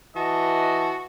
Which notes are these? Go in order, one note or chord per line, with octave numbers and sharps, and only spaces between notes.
E3 F#4 D#5 A5